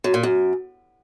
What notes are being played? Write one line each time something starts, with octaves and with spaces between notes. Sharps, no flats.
F#2
A#2
F#2